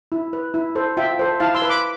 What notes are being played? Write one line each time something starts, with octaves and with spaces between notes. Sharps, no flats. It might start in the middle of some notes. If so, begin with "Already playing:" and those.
E4
B4
E4
A4 C5
F4 E5 G5
A4 C5
E4 F5 A5
C6 E6
B4
B5 D6